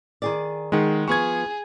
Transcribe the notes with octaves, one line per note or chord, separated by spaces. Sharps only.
D#3 G#4 D5
D#3 G#3 G#4 F#5
F3 B3 G#4 C#6 G#6